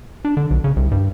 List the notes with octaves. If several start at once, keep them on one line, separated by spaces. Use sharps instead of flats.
D4
D3
B1
C#3
C2
G2